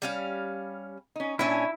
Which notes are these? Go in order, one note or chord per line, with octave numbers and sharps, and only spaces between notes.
G3 C#4 F5
C#4 D#4
A#2 C#4 D4 E4 C#5 G#5